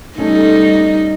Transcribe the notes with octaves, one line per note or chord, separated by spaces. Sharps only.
G3 A3 C#4 D#4 A4